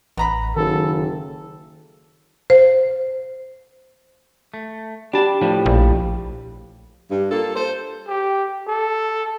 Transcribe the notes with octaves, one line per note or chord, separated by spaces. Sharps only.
A1 B3 A#5 B5
F#1 D#3 A4
C5
A3
G3 D4 G4 A5
A2 F3 D4
A#1
G2
A#3 F4 A4
A4 C5
G4
A4